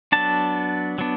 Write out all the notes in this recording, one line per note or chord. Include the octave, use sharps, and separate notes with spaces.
F#3 B3 D4 A5
F#3 B3 D4